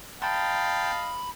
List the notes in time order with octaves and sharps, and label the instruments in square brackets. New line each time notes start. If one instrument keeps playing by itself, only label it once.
[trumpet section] D#5 F5 [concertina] G5 [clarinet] A5 [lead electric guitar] B5 C6